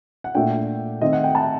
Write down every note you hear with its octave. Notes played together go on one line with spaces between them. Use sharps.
F#5
A#2 A3 D4 G5
D#3 A3 C4 D#5
F#5
G5
A5